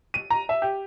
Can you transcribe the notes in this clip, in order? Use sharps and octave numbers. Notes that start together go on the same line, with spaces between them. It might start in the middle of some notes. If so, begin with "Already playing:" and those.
D#7
A#5
E5
G4